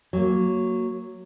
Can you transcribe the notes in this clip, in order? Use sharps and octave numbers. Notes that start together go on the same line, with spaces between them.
F#3 A#3